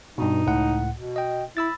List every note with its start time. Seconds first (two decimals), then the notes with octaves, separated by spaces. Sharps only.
0.18 G2 B2 D#4
0.46 C#2 A2 F#5
0.97 B2
1.16 D#5 G5
1.57 E4 B5 E6 A6